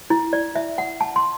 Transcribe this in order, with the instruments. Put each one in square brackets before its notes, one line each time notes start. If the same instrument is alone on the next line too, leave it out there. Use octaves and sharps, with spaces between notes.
[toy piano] E4
D5
E5
F#5
A5
C6